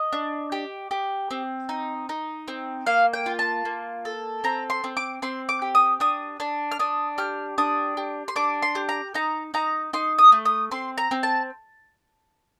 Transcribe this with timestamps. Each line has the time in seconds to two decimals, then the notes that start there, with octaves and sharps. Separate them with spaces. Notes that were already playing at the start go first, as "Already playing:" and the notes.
Already playing: D#5
0.13 D4
0.52 G4
0.91 G4
1.31 C4
1.69 D#4
2.09 D#4
2.48 C4
2.87 A#3 F5
3.14 G5
3.26 F4
3.39 A5
3.65 A#3
4.05 A4
4.44 C4 A#5
4.70 C6
4.84 C4
4.97 D6
5.22 C4 C6
5.49 D6
5.62 G4
5.75 D#6
6.00 D4 D#6
6.40 D4
6.71 F6
6.79 D4 D#6
7.18 G4 F6
7.58 D4 D#6
7.97 G4
8.28 C6
8.36 D4 D6
8.62 C6
8.75 G4
8.89 A#5
9.14 D#4 A#5
9.54 D#4 A#5
9.93 D#4 C6
10.18 D#6
10.32 A3
10.45 D#6
10.71 C4 C6
10.98 A#5
11.11 C4
11.23 A5